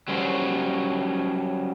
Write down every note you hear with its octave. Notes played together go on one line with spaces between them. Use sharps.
F#3 G3 C#4 C5